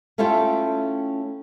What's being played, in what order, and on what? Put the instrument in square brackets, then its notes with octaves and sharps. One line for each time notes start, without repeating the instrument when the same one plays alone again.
[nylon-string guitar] A3 C#4 E4 F4 A4 G5